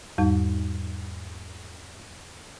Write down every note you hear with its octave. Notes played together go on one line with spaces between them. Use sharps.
E2 G#2 G3 D#4